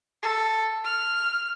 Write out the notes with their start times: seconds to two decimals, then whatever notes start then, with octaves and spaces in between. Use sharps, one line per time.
0.22 A4
0.84 F6